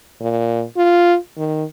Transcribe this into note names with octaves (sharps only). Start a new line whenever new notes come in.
A#2
F4
D#3